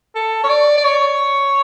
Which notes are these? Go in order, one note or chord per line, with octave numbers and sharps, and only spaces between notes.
A4
C#5
D5
D5
C#5